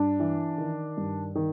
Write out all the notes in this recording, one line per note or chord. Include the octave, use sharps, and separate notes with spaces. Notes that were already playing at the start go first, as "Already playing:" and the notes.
Already playing: G2 D4
E3
D#3
G2
D#3